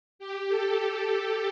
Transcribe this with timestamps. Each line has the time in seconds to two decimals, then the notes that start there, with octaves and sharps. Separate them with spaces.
0.19 G4
0.49 A4